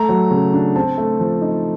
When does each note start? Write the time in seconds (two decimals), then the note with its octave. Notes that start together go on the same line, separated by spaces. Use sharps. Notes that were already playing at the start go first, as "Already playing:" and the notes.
Already playing: A3 A#5
0.09 F#3
0.31 C#3
0.53 D4
0.76 C4 A5
0.98 A3
1.19 F3
1.42 D#4